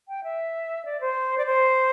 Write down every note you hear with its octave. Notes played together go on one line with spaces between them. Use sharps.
G5
E5
D5
C5
D5
C5